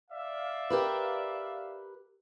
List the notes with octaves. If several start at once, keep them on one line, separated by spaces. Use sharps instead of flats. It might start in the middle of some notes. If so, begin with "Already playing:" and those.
D5 E5 F5
G4 A#4 B4